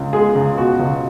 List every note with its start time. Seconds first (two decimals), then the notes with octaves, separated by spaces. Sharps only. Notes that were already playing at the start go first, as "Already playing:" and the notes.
Already playing: C#2
0.13 G#3 G#4
0.35 C#2
0.58 B2 F#4
0.80 C#2